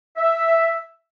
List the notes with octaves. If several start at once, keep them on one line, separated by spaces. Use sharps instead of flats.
E5